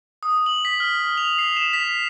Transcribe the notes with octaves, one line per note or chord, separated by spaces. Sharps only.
D#6
F#7
B6
F6
F7
C7
E7
B6